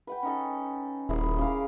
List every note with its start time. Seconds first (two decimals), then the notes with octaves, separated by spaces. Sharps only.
0.07 B4 F#5 G5
0.23 C#4 D#4 A4
1.09 D#1 E4 G#4 A#4
1.38 C#3 F5 D6